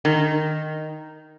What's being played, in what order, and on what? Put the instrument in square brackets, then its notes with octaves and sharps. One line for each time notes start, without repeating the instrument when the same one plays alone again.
[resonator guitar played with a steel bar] D#3